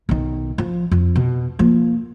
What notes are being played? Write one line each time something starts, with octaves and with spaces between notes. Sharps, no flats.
B1 D#3
F3
F2
B2
F3 A#3